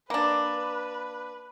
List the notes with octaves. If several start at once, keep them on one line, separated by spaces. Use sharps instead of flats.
A#3 D4 B4